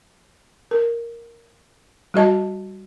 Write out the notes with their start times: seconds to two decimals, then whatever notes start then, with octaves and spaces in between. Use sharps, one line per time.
0.71 A#4
2.14 G3 F#4 D#5 A5